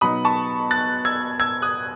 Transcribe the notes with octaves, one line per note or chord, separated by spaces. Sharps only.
B2 F#3 B3 D#4 B5 D#6
A5 C#6
F#6 A6
E6 G#6
E6 G#6
D#6 F#6